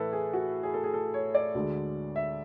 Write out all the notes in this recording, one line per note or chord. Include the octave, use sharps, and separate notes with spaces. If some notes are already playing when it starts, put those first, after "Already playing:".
Already playing: A2 E3 E4 A4 B4
G#4
F#4
G#4
A4
G#4
A4
C#5
D5
D2 D3 G#3
E5